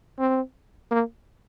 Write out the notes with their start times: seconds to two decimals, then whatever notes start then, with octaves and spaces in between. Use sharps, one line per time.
0.19 C4
0.91 A#3